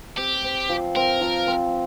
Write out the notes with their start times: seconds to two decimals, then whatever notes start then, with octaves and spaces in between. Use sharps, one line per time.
0.17 C4 G4
0.44 C4
0.69 F3
0.96 C4 A#4
1.21 F3
1.47 C4